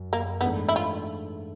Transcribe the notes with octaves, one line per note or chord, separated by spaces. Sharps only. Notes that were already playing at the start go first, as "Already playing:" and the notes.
Already playing: F#2
A#3
G#2 E3 A3 B3 D4
E4
F4